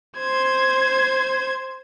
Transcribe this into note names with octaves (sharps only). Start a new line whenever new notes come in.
C5 G#6